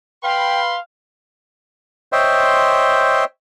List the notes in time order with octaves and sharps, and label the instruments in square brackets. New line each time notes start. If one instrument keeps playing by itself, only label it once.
[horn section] B4 B5 C6 [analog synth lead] F5 [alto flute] G5
[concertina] C5 C#5 D#5 E5 G5 C6